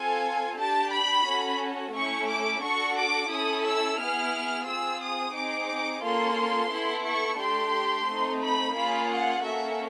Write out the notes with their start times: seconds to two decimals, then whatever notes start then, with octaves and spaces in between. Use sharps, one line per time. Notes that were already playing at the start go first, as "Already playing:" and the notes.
Already playing: C4 F4 A4 G#5
0.58 D4 G4 A5
0.92 B5
1.26 C#4 F#4 A4
1.94 A3 C#4 E4 C#6
2.28 D6
2.62 D4 F#4 A4 C#6
2.97 D6
3.30 C#4 E4 A4 D#6
3.64 E6
3.99 B3 E4 G#4 F6
4.66 C4 F4 G#4 E6
5.01 D#6
5.34 C4 D#4 G#4 D6
6.03 A#3 C#4 F4 A4 C6
6.71 B3 E4 A4
7.05 C#6
7.38 A3 D4 G4 C6
8.07 A3 C4 D#4
8.40 B5
8.75 A#3 C#4 F4 G#4 B5
9.09 F#5
9.43 A#3 C#4 F#4 A4 E5